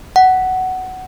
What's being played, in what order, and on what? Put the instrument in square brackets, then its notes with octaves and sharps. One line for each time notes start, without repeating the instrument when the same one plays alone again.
[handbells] F#5